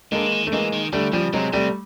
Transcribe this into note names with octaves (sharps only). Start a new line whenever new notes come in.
D3 G#3 A#3
E3
D#3
A3
E3 G#3 A#3
D#3
D3 G3 A3
C#3 F3 G3
C3 F#3 G#3
C3 G3 A3